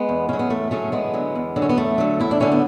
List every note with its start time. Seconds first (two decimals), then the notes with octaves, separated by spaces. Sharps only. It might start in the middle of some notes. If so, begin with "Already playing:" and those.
Already playing: G#3 B3
0.09 E2
0.29 C#3 F#3 C#4
0.39 B3
0.50 E2 A3
0.71 C#3 F#3 A3 C#4
0.92 E2 G#3 B3
1.14 D3 F#3
1.35 E2
1.56 D3 F#3
1.62 C#4
1.69 B3
1.77 E2 A3
1.98 D3 F#3
2.20 E2 E4
2.31 D4
2.40 D3 F#3 C#4
2.52 B3